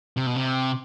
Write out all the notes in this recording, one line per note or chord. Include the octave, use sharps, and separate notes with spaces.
C3
B2
C3